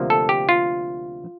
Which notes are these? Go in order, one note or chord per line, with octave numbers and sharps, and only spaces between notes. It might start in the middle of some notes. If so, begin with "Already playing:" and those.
Already playing: D2 C3 F3 A#3
A4
G4
F4